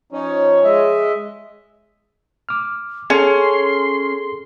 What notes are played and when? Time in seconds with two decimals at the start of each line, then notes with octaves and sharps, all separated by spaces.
0.13 F3 C#4 D#4 C#5
0.64 G#3 D#5 E5
2.49 D6 F6
3.10 C#4 G#4 A4 C6